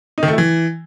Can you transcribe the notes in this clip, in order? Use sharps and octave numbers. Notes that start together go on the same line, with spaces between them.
D#4
D#3
A3
E4
E3